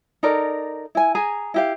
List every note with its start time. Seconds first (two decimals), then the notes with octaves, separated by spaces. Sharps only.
0.23 D#4 A4 A#4 D5
0.95 E4 G#5
1.15 G#4 G#5 A#5
1.54 E4 G4 F5